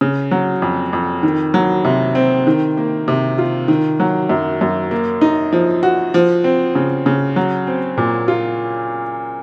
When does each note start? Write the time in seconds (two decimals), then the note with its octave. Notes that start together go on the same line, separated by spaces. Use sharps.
0.01 C#3
0.31 F#3
0.62 F2
0.93 F2
1.23 D#3
1.54 F#3
1.85 C3
2.15 C4
2.47 D#3
2.77 A#3
3.08 C3
3.38 F4
3.68 D#3
4.00 F#3
4.29 F#2
4.61 F#2
4.91 A#3
5.21 D#4
5.53 F3
5.83 F#4
6.14 F3
6.44 C4
6.75 C#3
7.06 C#3
7.36 F#3
7.67 C4
7.97 A#2
8.28 F4